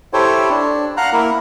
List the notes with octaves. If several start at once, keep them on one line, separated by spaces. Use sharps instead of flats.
E4 G4 A4 C5 C#5
D4
F5 F#5 A#5 F#6
A#3 E4 A#4